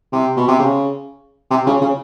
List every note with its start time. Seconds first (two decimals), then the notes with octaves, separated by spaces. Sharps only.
0.13 C3
0.37 B2
0.48 C3
0.59 C#3
1.51 C3
1.67 C#3
1.81 C#3